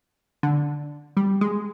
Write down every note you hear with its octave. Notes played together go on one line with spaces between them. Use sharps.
D3
G3
G#3